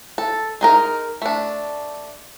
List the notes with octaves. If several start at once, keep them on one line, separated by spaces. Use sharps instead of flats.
A4
G#3 D#4 A#4
A3 D4